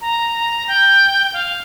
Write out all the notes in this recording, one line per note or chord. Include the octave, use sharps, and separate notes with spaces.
A#5
A#5
G5
F5